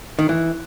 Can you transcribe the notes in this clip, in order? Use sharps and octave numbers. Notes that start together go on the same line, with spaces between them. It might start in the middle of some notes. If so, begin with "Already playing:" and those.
D#3
E3